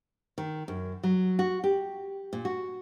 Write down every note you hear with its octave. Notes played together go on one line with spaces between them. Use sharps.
D#3
F#2
F#3
F#4
G4
A#2
F#4